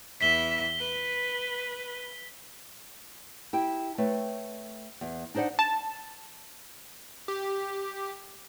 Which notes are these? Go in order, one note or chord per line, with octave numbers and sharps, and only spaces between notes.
E2 E5 B6 G7
B4
E4 G4 G5
A3 C4 B4 C#5
E2
D4 D#4 C5 D5 F#5
A5
G4